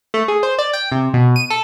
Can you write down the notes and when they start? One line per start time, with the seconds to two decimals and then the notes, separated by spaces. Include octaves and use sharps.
0.14 A3
0.28 G#4
0.43 C5
0.58 D5
0.73 G5
0.92 C3
1.14 B2
1.36 D#7
1.50 A4